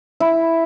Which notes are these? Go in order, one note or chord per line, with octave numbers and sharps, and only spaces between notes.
E4